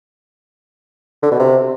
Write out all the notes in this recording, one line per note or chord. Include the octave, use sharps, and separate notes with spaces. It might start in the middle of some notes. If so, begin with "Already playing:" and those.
D3
B2
C3